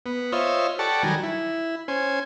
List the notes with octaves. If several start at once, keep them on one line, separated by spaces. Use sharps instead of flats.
B3
F4 C5 C#5 D#5 E5
G4 A4 D5 F#5 A5 C#6
D#3 F#3 G3 G#5 A#5
E4
C#4 C5 G#5